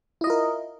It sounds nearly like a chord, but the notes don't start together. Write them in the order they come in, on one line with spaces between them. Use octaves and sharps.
E4 D#5 F4 A#4